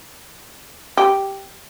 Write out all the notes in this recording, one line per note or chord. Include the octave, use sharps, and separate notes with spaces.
G4